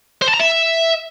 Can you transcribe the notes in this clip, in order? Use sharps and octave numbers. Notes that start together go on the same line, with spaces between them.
C5
A5
A#5
E5